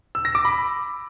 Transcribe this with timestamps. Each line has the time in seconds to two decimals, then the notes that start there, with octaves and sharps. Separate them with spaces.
0.15 E6
0.25 A#6
0.35 D6
0.45 B5